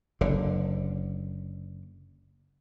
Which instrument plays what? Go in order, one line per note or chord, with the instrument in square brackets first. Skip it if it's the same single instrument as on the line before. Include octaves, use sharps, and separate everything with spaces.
[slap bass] F#1 D3